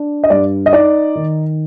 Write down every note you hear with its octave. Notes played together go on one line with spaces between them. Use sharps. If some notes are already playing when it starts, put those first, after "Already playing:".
Already playing: D4
D#5
G2 D5
D#5
D#4 D5
D#3